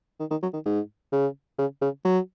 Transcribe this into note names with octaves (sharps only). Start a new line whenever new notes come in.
D#3
D#3
F#3
D#3
G#2
C#3
C#3
C#3
F#3